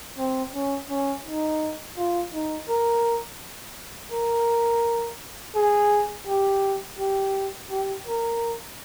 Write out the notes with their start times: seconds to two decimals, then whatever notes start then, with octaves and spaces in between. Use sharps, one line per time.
0.18 C4
0.54 C#4
0.90 C#4
1.26 D#4
1.98 F4
2.33 D#4
2.69 A#4
4.12 A#4
5.55 G#4
6.27 G4
6.99 G4
7.71 G4
8.07 A#4